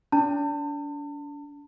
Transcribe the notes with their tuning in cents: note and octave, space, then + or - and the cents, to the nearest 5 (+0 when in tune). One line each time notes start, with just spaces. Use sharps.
D4 -35 A5 +35